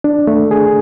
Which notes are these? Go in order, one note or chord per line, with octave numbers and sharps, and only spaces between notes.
D4
A3
G#4